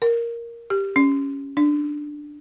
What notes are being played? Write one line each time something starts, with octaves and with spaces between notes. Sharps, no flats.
A#4
G4
C#4
D4